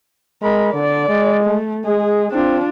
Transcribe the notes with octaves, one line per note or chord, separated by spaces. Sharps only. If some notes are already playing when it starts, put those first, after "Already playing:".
G#3 A#4 B5
D3 D5
G#3
A3
G#3 G#4
C4 D4 F4